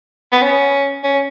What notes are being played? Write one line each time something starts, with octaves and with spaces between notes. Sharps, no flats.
B3
C#4
C#4